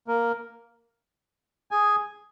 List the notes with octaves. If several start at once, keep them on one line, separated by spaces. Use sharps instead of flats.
A#3 A#4
G#4 G#5